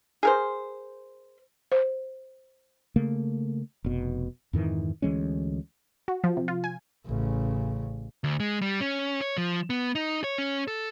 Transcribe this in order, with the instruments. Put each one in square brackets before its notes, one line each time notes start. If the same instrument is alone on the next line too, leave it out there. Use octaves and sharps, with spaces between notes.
[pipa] G#4 A#4 C5
[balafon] C5
[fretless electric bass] C#3 A3 A#3
F1 B2
F2 G#2 D#3 E3
D2 E3 G#3 C#4
[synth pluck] F#4
F3
C3
F4
G#5
[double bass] A1 C#3
[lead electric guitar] D2
G#3
G3
C#4
C#5
F3
B3
D#4
C#5
C#4
A4